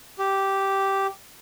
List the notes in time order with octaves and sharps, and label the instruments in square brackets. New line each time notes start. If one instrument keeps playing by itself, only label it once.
[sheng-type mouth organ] G4